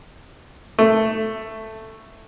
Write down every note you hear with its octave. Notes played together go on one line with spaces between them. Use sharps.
A3